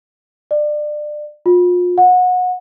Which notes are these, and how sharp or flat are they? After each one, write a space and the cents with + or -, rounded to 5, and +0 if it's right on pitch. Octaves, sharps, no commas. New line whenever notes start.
D5 +25
F4 +35
F#5 -25